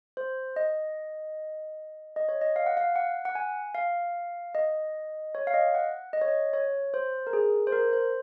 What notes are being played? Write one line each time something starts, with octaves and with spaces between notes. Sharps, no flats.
C5
D#5
D#5
C#5
D#5
F5
F#5
F5
F#5
F#5
G#5
F5
D#5
C#5
F5
D#5
F#5
D#5
C#5
D#5
C#5
C5
A#4
G#4
C5
A#4
C5